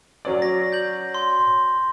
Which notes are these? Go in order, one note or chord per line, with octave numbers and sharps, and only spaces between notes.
F#3 C#4 D5
A#6
G6 F#7
C6